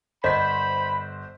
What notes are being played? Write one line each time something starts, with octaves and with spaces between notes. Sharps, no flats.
G1 C5 D#5 B5 B6